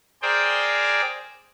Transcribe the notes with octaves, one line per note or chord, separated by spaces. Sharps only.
G#4 A#4 C5 D5 G5